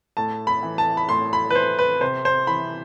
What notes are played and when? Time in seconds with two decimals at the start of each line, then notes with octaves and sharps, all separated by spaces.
0.17 A2 A5
0.47 B5
0.63 E3
0.78 A5
0.97 B5
1.09 A2 C6
1.33 B5
1.50 B4
1.55 E3 C5
1.79 B4
2.01 C3 C5
2.25 C5
2.47 E3 B5